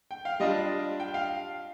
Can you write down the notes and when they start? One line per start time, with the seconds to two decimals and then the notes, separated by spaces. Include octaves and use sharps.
0.11 G5
0.25 F5
0.40 G3 D4 F4 D#5
1.00 G5
1.14 F5